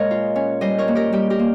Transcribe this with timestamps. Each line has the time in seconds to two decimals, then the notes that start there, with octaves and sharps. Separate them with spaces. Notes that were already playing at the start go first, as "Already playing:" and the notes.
Already playing: A#2 G#3 A#4 C#5 D#5 F5
0.11 F4
0.36 C#4
0.61 G3 C5 D#5
0.78 A#4 C#5
0.88 A#3
0.95 G4 A#4
1.12 G3 G4
1.30 G4 A#4
1.39 A#3